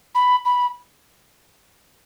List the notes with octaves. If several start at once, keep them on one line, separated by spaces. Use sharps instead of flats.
B5
B5